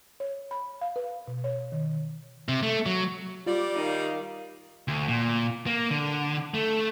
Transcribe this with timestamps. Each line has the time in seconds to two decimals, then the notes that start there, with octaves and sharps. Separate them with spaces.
0.20 C#5
0.51 B5
0.81 F5
0.96 B4
1.28 B2
1.44 C#5
1.72 D#3
2.48 C3
2.63 A3
2.86 F#3
3.47 G3 F4 D5
3.76 D#3 D#4 F5
4.88 D2
5.09 A#2
5.67 A#3
5.91 D3
6.54 A3